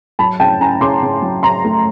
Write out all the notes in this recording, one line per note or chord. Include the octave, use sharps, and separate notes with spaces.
F#3 A5 B5
C#3 G5 A5
C#4 G#5 A#5
C#3 C6 D6
C#3
F#3
C#3 A#5 C6
A3